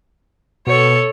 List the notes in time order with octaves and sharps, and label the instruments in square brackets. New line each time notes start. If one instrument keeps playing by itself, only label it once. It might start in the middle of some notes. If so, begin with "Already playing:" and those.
[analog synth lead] B2 [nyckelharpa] A4 C#5